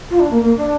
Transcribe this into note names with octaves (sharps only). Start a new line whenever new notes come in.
F4
D4
A#3
A#3
D4